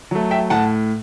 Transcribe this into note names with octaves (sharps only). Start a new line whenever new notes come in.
F#3 A3
E5 G5
A2 F#5 A5